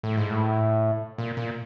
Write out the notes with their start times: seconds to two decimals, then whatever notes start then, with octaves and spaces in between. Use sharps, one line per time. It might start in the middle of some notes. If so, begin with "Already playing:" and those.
0.03 A2
0.17 G#2
0.30 A2
1.18 A#2
1.37 A#2